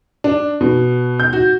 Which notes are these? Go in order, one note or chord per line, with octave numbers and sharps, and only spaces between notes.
D4
B2
G6
F#4